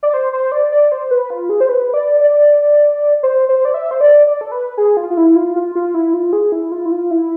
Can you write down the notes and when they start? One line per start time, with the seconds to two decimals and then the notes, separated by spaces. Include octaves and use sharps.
0.03 D5
0.14 C5
0.33 C5
0.52 D5
0.72 D5
0.92 C5
1.11 B4
1.30 F4
1.49 G#4
1.60 C5
1.69 B4
1.94 D5
2.21 D5
3.23 C5
3.49 C5
3.65 D5
3.74 E5
3.91 C5
4.01 D5
4.27 D5
4.41 A4
4.52 B4
4.77 G#4
4.97 F4
5.10 F4
5.17 E4
5.36 F4
5.56 F4
5.75 F4
5.94 E4
6.14 F4
6.33 G#4
6.52 E4
6.72 F4
6.86 E4
6.92 F4
7.11 E4